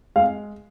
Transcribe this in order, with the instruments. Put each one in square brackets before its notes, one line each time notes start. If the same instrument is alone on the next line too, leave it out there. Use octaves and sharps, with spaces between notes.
[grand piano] G#3 F5